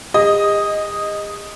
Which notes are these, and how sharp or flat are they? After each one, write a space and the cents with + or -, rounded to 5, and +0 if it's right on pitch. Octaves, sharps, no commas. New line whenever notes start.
G#4 -45 D#5 +0